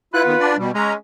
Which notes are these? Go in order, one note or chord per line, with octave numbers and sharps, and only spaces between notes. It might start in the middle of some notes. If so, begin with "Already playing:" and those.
E4 F4 B4 F#5 F#6
D#3 B3
D4 D5
B2 G3
G#3 C#4 A#5